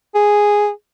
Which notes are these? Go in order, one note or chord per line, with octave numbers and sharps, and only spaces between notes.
G#4